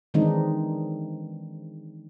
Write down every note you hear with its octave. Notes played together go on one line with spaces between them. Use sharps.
D#3 E3 G#3 C4 D4 D#4